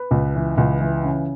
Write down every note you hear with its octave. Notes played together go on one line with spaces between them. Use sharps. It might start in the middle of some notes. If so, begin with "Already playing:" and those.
Already playing: B4
C#2
E3
C#2
E3
C#3